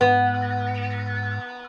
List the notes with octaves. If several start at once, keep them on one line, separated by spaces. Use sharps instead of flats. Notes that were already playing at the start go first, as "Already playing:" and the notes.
G#2 B3